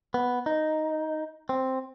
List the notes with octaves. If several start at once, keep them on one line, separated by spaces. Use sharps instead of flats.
B3
D#4
C4